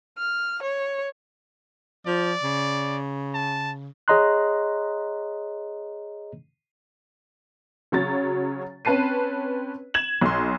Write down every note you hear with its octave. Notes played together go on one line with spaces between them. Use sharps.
F6
C#5
F3 D5
C#3
A5
G#4 C#5 D#5 A#5 C6 F#6
C#3 F#3 C#5 A6
C4 C#4 B4 A5 C7 D#7
G#6 E7 F#7
B1 C6